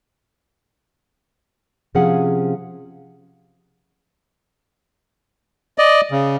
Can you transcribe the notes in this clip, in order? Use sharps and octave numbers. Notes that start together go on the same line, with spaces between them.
C3 F3 C#4 G#4 F5 F#5
D5 D#5
C#3